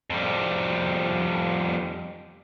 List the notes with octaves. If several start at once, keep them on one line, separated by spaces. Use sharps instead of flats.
F2 G3